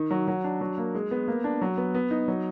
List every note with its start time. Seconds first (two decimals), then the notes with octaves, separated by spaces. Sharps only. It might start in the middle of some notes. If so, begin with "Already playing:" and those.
Already playing: D#3
0.11 F#3
0.28 F#3
0.44 D4
0.61 F#3
0.78 A#3
0.95 G#3
1.11 B3
1.28 A#3
1.44 D4
1.61 F#3
1.78 B3
1.95 B3
2.11 D#4
2.28 F#3